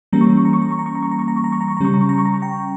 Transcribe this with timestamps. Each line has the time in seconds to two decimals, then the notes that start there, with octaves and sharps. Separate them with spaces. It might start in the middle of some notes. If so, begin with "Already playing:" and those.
0.13 E3 G3 A#3 C#4 A#5
0.21 C#6
0.30 A#5
0.37 C#6
0.45 A#5
0.53 C#6
0.62 A#5
0.71 C#6
0.79 A#5
0.86 C#6
0.95 A#5
1.03 C#6
1.11 A#5
1.19 C#6
1.28 A#5
1.36 C#6
1.44 A#5
1.52 C#6
1.61 A#5
1.68 C#6
1.77 A#5
1.80 C#3 G3 C#4 C#6
1.94 A#5
2.01 C#6
2.09 A#5
2.18 C#6
2.25 A#5
2.34 C#6
2.42 G5 A#5